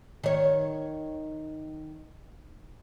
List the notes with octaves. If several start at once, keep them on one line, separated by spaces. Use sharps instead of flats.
D#3 C#5